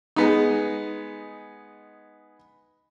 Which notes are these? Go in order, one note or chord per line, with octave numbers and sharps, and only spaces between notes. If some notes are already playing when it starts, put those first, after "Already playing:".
G#3 B3 D#4